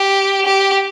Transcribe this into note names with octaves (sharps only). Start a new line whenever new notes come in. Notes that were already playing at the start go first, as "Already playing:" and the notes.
Already playing: G4
G4